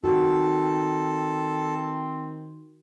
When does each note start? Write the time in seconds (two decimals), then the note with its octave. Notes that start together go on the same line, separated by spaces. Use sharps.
0.04 D#3 C4 F#4 A4